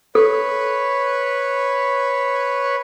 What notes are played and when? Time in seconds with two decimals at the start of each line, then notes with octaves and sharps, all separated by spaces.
0.15 A4 B4 C#5